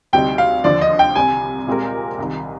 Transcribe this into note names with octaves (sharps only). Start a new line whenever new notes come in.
D2 C3 G3 C4 D#4 G5
F5
D#2 D3 F3 D5
D#5
G5
C2 C3 G3 G#5
A#2 G#3 C4 G4 A#4
C2 C3 D#3